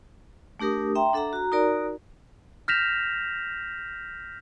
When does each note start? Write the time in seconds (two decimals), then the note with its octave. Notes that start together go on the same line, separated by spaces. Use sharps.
0.60 A3 D4 G4 A#4 D#6
0.95 E5 G5 A#5 C6
1.13 D4 A4 E5 F#5 A#5
1.33 F#4 A#5
1.52 D#4 F#4 A#4 D5 A#5
2.68 F6 G6 A#6 B6 E7 F7